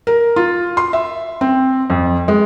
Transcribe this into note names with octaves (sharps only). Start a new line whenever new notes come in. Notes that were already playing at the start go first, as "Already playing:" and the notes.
A#4
F4
C6
E5
C4
F2
G#3